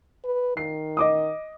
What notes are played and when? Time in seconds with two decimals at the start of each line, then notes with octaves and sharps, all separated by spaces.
0.25 B4
0.57 D#3 C7
0.97 D#5 D6 D#6